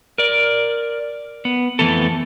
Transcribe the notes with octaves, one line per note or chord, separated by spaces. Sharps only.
A#4 D5
B3
F2 B2 E3 A3 B3 A4